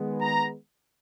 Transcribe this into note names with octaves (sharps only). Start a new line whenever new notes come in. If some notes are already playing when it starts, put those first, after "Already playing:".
Already playing: D#3 G#3 B3
A#5